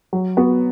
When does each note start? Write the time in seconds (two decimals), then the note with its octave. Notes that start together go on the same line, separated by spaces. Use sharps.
0.13 F#3
0.37 B3 F#4